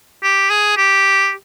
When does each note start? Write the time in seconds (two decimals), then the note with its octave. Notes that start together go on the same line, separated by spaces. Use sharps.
0.23 G4
0.50 G#4
0.77 G4